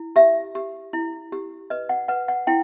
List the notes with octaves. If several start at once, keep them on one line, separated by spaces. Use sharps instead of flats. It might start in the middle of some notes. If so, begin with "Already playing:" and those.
Already playing: E4
G4 E5
G4
E4
G4
B4 D#5
F#5
B4 F#5
F#5
E4 G5